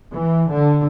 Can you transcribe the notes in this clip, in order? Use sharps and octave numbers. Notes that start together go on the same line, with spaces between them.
E3
D3